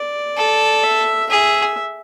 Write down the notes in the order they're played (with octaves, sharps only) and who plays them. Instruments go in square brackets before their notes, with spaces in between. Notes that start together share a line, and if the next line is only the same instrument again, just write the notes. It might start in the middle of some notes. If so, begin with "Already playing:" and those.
Already playing: [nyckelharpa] D5
[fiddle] A4
[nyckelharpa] E5
[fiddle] G#4 [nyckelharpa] E5